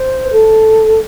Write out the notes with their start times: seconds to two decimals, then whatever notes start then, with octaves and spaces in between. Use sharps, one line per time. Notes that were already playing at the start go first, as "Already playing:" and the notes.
Already playing: C5
0.24 B4
0.31 A4